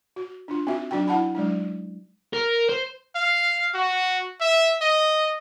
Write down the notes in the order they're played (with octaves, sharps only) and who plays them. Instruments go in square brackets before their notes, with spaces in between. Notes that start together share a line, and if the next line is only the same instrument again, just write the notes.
[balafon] F#4
D4 F4
C4 D#4 F#4 E5
F#3 D4 D#4 F#4 G5
E4 F#5 A5 B5
F#3 G#3 D4 D#4
[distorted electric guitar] A#4
C5
[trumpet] F5
F#4
E5
D#5